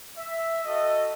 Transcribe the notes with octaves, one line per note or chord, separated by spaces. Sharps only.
E5
F#4 A4 D#5